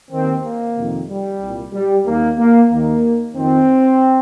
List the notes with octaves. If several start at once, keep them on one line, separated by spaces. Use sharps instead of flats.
D#2 D#3 C4
A#3
F2 C3 D#3
G3
C2 A#2
G3
D#2 D#3 A#3
A#3
D#2 D#3 A#3
F2 D#3 C4